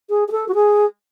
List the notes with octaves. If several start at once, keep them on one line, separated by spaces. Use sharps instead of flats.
G#4
G#4
A4
F#4
G#4